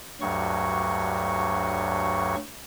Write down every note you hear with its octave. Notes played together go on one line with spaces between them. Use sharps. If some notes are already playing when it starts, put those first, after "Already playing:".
D2 G2 F#3 C#6